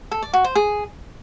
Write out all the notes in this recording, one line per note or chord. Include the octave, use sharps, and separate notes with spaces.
A4
D5
F#4
C5
G#4